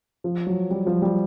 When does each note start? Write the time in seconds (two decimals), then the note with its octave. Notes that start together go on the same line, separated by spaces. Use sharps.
0.24 F3
0.47 F#3
0.70 G3
0.86 F3
1.02 G3